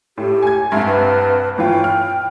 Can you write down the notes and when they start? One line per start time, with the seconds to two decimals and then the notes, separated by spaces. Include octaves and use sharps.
0.18 A2 G4
0.42 G#5 G#6
0.72 C2 G2 E5
0.87 B4
1.58 G1 E3 F4 G5
1.84 F6